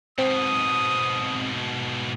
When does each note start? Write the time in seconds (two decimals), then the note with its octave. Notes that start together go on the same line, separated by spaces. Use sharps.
0.18 G#2 B2 C4 D#6